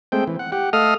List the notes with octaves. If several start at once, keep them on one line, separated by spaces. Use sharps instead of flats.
G#3 A3 C4 G5
E3
F#5
G4 F#5
A3 A4 D#5 F5 D#6 F6